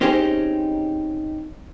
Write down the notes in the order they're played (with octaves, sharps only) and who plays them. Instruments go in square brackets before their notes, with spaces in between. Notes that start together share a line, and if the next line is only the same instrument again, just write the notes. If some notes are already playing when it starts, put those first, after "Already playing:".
[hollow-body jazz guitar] C4 C#4 D#4 G4 G#4 C5